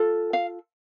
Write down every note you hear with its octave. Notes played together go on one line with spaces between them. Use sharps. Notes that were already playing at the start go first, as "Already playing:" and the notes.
Already playing: F4 A4
F5